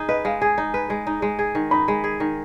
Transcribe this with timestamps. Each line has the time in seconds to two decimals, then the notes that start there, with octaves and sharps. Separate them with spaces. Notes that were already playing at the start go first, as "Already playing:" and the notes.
Already playing: D#4 G#4
0.09 B4 D#5
0.25 G#3 F5
0.41 G#4 G#5
0.58 D#4
0.74 B4
0.90 G#3
1.07 D#4
1.22 G#3
1.39 G#4
1.55 D#3
1.71 D#4 B5
1.88 G#3
2.04 G#4
2.20 D#3